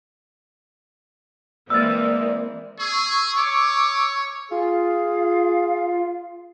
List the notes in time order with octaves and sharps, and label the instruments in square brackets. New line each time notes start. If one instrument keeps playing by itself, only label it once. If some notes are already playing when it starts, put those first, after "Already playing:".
[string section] E3 G#3 C4 [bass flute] A#3 [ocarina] D5 [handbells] E6 F6 A6
[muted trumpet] G#4 [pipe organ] C#6 E6
[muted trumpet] C#5 [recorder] D6
[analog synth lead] F4 [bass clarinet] G#4 [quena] F5